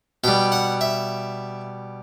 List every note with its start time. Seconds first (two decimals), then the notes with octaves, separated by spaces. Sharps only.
0.24 B2 G3 G5
0.52 F#5
0.81 E5